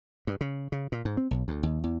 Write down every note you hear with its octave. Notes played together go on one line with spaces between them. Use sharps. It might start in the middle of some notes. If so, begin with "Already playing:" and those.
G2
C#3
C#3
A#2
G#2
C4
B1
D2
D#2
E2